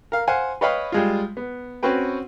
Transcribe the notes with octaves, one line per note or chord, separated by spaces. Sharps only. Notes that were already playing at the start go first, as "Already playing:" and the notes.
A#4 F5
C5 F5 F#5 G#5
B4 C#5 D#5 F5 G5 B5
G3 G#3 F4
B3
C4 C#4 F#4 B4 G5